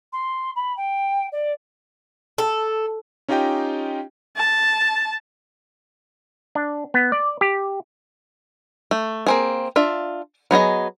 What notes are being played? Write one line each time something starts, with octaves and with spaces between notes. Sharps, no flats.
C6
B5
G5
D5
A4
C#4 D#4 F4 G4 D#5 G5
A5
D4
B3
D5
G4
A3
A#3 C4 G#4
D4 F4 E5
F#3 B3 G#4 D#5